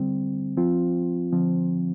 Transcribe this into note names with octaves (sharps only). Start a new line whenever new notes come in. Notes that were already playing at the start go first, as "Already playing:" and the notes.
Already playing: D3 G3 C4
F3 C4 F4
D3 F3 C4